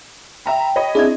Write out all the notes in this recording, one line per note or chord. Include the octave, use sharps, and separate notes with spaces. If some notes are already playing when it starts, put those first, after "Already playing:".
E5 G5 A#5 B5
C#5 D#5 B5
C4 D4 E4 G#4 D#5 E5 G#6